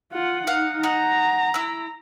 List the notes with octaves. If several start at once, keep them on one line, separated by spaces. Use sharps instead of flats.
F4 F#5
D#4 F5 F#5
D#4 F#5 A#5
E4 E6